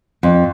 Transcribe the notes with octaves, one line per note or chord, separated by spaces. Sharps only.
F2